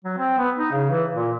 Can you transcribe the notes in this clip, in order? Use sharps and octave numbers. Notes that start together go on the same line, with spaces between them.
F#3
C4
B3
D#4
C#3
E3
A#2